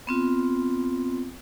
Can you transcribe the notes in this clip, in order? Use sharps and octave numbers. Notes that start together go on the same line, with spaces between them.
B3 C4 F4